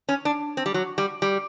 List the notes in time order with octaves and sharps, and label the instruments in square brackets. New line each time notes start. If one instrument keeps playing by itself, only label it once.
[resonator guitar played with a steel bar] C#4
D4
C4
G3
F#3
G3
G3